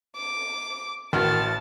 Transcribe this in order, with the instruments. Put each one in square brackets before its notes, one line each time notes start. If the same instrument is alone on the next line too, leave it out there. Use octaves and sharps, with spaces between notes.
[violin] D6
[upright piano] A1 F#4 [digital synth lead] D#3 [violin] A5 A6 [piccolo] F6